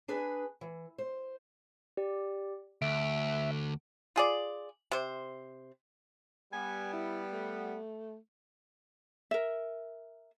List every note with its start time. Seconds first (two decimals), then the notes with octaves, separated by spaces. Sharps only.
0.08 D4 G#4 B4 G#5
0.61 E3
0.98 C5
1.97 G4 D5
2.82 D2 E5 D7
4.16 F4 G#4 D5
4.91 C3 C5
6.53 G3 B3 G#5
6.93 E4
7.33 A3
9.31 A#4 E5